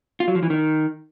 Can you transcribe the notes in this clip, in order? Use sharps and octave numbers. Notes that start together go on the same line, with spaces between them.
F4
F#3
F3
E3
D#3